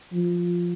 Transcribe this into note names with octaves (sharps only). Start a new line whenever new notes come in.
F3